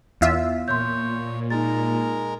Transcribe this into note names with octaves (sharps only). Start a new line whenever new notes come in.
E2 F4 E5
A#2 C#5 C6 G6
G#3 D#4 A#4 A6